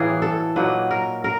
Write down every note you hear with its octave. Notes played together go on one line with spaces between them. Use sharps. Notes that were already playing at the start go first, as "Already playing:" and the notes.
Already playing: A2 E3 G3 A#3 G#4
A4
A#2 F#3 A#3 D#4 B4
A#4
A#4